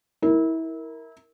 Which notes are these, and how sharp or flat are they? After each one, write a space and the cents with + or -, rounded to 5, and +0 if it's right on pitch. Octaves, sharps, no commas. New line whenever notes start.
E4 -25 A#4 +0